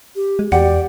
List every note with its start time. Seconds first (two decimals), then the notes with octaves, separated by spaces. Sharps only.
0.16 G4
0.39 G#3
0.52 E2 G4 D5 F#5